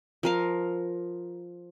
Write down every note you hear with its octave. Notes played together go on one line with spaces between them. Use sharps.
F3 A#4 F5